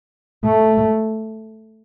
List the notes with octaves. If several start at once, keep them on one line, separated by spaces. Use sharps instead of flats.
A3